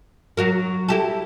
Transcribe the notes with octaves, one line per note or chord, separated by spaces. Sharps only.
F#3 F#4 A#4
E4 G4 A4